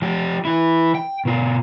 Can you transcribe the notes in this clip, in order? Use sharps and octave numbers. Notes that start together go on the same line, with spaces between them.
F3 G4
E3 E4
G5
B2 F4